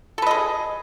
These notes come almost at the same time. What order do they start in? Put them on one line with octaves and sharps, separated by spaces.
A4 B4 D#5 G#4